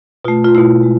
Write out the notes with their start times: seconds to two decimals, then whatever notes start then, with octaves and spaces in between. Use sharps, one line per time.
0.25 B2 F4
0.28 A3
0.45 F4
0.54 B2 A3 E4
0.83 G#3